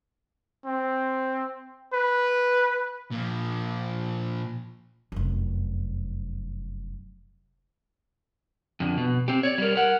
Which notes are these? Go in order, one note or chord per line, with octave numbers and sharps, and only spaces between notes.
C4
B4
A#2 F3
F1 F#2
F2 D3
B2
C4 G4
C#5 D5
G3 A#4
A#4 F#5